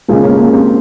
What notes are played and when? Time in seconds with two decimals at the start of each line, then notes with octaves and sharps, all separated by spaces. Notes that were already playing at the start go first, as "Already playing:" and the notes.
0.08 C#3 F3 G#3 A#3
0.23 A#3 C#4
0.38 A#3
0.53 C4